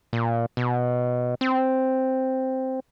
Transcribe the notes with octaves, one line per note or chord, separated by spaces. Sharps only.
A#2
B2
C4